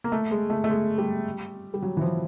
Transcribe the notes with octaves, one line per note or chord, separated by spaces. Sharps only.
A#3
A3
G#3
A3
A3
G#3
G3
G3
F#3
E3
F3